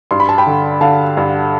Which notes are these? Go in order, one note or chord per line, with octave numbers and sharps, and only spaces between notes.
G2 C6
B5
A5
G5 B5
D3
D3 F5 A5
G2